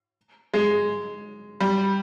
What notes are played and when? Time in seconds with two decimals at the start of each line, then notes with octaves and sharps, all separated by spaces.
0.54 G#3
1.60 G3